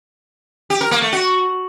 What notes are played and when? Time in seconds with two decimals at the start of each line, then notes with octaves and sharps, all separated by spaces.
0.70 G4
0.81 A#4
0.91 A#3
1.02 A3
1.13 F#4